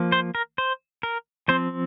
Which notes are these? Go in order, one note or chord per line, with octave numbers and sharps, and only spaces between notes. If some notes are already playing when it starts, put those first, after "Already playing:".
Already playing: F3 A#3
C5
A#4
C5
A#4
F3 C4 C5